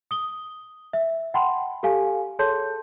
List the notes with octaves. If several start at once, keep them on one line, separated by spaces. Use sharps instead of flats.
D#6 G7
E5
F#5 G5 A5 B5 C6
G4 A4 F5 G#5
G#4 A4 C#5 A5 C6 G6